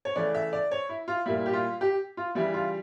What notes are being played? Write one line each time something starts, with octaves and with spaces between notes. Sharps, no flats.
C#5
C#3 E3 A3 D5
E5
D5
C#5
E4
F4
A#2 G3 E4
G4
F4
G4
F4
C#3 E3 G3 E4
F4